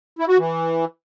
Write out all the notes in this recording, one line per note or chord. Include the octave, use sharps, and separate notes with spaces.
E4
F#4
E3